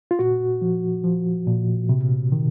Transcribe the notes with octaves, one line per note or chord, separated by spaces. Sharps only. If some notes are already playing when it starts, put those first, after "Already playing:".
F4
A#2 F#4
F3
F3
A#2
C3
D#3